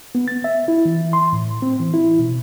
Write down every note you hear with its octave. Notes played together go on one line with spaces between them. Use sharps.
B3
A6
E5
E4
E3
C6
A2
C4
E3
E4
B2